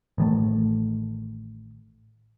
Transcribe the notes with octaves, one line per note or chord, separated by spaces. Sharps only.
A1 D#3 A3